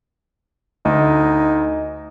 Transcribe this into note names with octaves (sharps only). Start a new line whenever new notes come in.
D2 D#4